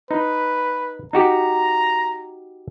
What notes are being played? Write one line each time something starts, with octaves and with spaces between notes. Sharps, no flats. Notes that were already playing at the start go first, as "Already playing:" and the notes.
D#4 B4
D#4 F#4 G4 A#5